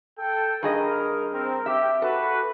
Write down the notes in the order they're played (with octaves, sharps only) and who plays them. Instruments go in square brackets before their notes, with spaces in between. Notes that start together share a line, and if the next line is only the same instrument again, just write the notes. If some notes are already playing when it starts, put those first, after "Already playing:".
[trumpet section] A4 G5
[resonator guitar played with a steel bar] G2 G#4 D#5 [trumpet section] A#4
[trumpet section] C4 A#4
[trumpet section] G4 [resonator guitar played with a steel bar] E5
[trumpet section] F#4 B4 [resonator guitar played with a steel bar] A4